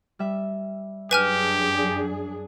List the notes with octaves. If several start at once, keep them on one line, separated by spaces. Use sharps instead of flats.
G3 E5
F#2 D4 G4 G#4 B4 G#5 F6